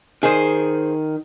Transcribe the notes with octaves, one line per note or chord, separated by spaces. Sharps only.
D#3 G#4 C5